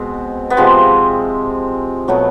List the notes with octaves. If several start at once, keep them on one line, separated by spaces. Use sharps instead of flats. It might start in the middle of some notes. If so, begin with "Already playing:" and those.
Already playing: B2 G#3 C4
B3
C3 F3 G#3 C4
B2 F#3 A3 B3